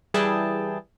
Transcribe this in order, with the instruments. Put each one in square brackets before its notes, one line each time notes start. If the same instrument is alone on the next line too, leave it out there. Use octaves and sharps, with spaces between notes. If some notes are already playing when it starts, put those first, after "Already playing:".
[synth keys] E3 G3 E4 G#4 G5 A5